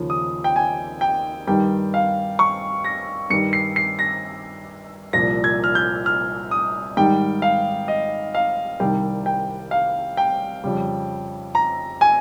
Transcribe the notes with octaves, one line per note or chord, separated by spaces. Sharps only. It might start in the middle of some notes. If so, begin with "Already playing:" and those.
Already playing: D#2 C#3 F3
D#6
G5
G#5
G5
G2 D#3 G3 G5
F5
C#6
A#6
G2 D#3 G3 C#7
C7
C7
A#6
C2 A#2 F3 A#6
G#6
F6
G6
F6
D#6
G#2 D#3 G3 G5
F5
D#5
F5
C2 C3 D#3 G3 G5
G5
F5
G5
F2 C#3 G3
A#5
G#5